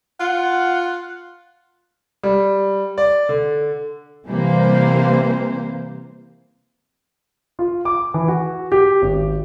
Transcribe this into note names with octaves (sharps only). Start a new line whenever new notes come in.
F4 F#5
G3
D5
D3
C3 E3 G3 A#3 C5
F4
D6
E3
F#4
G4
G#1